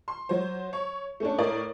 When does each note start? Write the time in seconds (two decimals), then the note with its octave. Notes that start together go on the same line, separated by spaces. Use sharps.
0.08 C6
0.29 F#3 C5
0.73 C#5
1.20 A3 C#4 D4
1.38 A2 A#4 C#5 D5